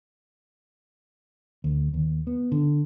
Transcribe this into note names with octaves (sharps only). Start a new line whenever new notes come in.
D2
D#2
B3
D3